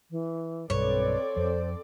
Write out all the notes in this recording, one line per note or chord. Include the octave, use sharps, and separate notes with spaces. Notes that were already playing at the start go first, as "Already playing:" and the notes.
E3
B1 G2 C4 A4 B4 C#5 D5
F2 C5